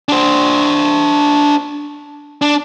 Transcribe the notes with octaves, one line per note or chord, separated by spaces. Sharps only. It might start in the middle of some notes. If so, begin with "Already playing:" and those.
D4 C5
D4